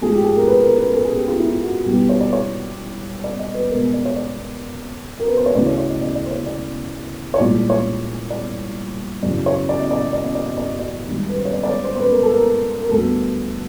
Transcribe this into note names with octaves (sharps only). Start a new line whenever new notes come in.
G#2 F3 A3 G#4
G4
G#4
A#4
B4
A#4
B4
A#4
A4
G#4
G4
F4
E4
F#4
C2 B2 G3 B3 G4
C#5
D5
C#5
D5
D#5
B4
B2 G#3 B3 A#4
D5
C#5
D5
A#4
B4
C5
C#5
D2 C#3 E3 D5
C#5
C#5
D#5
D5
D5
C5
C#5
D5
C#5
C2 A#2 F3 G#3 D5
C#5
D5
F#2 C#3 E3 D5
C#5
D5
D#5
D5
D#5
D5
D#5
D5
D#5
D5
D#5
D5
G#2 D#3 G3
B4
C5
C#5
D5
D5
C#5
C5
C5
B4
A#4
A4
A#4
A#4
A#4
D2 D3 G3 B3 A4